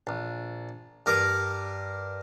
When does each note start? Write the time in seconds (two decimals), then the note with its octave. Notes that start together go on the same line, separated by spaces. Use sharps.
0.07 A#1
1.06 G2 A#4 D6